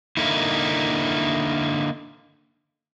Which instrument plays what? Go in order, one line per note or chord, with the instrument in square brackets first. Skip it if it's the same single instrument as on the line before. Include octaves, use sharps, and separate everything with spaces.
[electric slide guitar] D3 A#3 D#4 E4